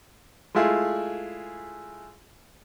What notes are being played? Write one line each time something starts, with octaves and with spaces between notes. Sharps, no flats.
G#3 A3 E4 F4 G#4